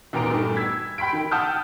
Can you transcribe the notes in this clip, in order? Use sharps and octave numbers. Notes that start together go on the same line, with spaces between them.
D#2 A#2 B3 A#5 D7
G2 A#2 D#3 A3
E6 G#6 B6
G5 B5 C6 B6 D7
D#3
F#5 G5 A5 D#6 F6 G6